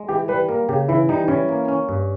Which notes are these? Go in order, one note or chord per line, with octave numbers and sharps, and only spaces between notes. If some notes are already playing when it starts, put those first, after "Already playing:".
Already playing: G#3
E3 G4
G3 B4
A#3 A#4
C#3 G4
E3 E4
G3 D#4
E3 C#4
A#3
C#4
G2